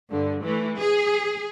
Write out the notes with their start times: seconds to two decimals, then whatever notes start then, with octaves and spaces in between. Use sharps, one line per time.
0.11 G2 D3
0.43 E3 A3
0.78 G#4